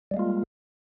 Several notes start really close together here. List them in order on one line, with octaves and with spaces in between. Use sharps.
G3 G#3 A#3 F4